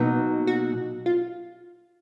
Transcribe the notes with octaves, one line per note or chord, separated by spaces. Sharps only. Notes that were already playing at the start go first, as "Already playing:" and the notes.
Already playing: B2 F#3 A#3 D#4 B4
F#4
F4